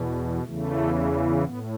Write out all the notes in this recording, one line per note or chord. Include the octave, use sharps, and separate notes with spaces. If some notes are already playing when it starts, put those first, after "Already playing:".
Already playing: E2 B2
E2 C#3 E3 A3
A3
A2 B3